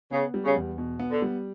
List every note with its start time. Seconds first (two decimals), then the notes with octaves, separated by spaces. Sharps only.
0.11 C#3 B3
0.34 G3
0.45 C#3
0.56 E2
0.78 B2
0.99 B3
1.11 D3
1.22 G3